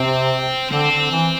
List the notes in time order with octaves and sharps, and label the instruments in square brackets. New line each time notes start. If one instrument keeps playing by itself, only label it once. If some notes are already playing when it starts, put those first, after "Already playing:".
Already playing: [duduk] C3 [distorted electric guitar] C4
[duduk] D3 [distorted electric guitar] C4
[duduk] D3
E3